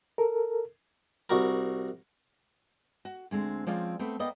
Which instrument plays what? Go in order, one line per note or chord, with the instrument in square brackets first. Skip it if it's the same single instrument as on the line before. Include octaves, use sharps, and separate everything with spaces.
[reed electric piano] A4 A#4
[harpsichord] C2 F#4 A#4
[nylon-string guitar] F#4
D2 G#3 C4
F3 G#3 C4 C#4 F4 D5
A3 B3 C4
A#3 B3 D5 D#5 G5